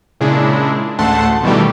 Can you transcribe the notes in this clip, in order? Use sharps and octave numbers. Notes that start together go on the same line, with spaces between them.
A#2 C#3 G#3 D4 E4
A1 D2 A3 F#5 A5 C6
B2 D#3 E3 G3 A3 G4